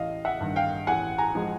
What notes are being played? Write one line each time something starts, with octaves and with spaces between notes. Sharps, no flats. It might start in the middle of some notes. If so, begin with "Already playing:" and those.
Already playing: A1 D#5 F5
E5 F#5
G2 D#3
F5 G5
A1 F#5 G#5
G#5 A#5
F3 G#3